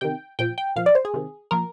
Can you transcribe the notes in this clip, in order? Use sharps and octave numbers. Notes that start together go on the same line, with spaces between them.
C3 D#3 G5
A#2 F3 G5
G5
A#2 F3 F5
D5
C5
G#4
C3 D#3
A#2 F3 A#4